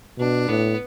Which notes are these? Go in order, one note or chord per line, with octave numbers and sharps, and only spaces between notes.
B2 D4
A2 B3